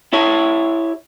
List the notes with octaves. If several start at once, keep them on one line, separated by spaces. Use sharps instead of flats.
E4 G4 C#5